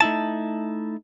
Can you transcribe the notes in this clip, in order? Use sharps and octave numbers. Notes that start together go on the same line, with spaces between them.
A3 D#4 E4 A5